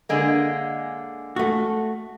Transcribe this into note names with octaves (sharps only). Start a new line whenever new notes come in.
D3 G#3 A#3
A3 F#4